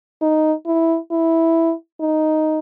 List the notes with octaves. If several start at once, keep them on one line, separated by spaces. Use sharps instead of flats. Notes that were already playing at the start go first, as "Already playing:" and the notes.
D#4
E4
E4
D#4